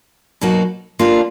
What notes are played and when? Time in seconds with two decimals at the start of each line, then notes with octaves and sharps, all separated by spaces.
0.41 B2 F#3 A#3 D#4 F#4
0.99 D3 G3 A#3 D4 F4